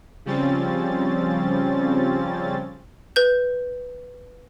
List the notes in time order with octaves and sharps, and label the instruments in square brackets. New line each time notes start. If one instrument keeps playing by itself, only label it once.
[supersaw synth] C#3 F3 G3 C4 C#4 A6
[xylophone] B4 G6